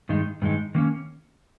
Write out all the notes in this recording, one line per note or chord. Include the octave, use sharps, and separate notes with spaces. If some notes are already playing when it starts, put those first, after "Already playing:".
G2 D#3 G#3 D#4
G2 D#3 G#3 D#4
D#3 A#3 C#4